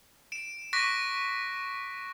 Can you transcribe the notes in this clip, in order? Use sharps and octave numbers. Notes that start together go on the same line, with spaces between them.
D7 E7
C#6 D6 F#6 A#6 B6 D7